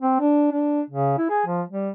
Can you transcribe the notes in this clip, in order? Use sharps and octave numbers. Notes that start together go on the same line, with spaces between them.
C4
D4
D4
C#3
E4
G#4
F3
G3